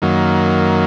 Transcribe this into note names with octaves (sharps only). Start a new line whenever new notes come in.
F#2 D#3 F#3 A#3